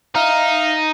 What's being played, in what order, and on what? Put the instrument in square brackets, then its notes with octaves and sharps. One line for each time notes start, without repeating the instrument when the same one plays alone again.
[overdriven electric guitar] D#4 [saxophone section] E5 F5